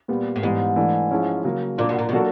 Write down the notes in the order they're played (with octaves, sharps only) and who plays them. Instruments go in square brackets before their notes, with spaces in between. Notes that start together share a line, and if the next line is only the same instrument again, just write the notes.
[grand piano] A#2 G3 B3
[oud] A2
[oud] G#2 [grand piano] E3 G3 B3
[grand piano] E3 A3 D4
F3 G#3 C#4 E4
C#3 F#3 A#3
[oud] A#2 [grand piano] A#3 D4 F4
[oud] B2
A#2
B2
[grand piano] F#3 A#3 D4 F#4 A4